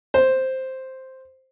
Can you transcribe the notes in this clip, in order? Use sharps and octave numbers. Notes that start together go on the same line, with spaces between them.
C5